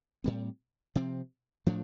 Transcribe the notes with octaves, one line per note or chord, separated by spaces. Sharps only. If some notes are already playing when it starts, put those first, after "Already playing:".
A2 G3 C4
C3 F3 C4
A2 F3 A3 D4